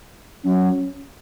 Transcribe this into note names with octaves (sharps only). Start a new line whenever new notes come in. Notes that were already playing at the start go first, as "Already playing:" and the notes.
F#3 C#4